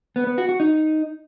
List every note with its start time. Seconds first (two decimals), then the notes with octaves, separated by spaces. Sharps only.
0.16 B3
0.27 B3
0.38 F#4
0.49 F#4
0.60 D#4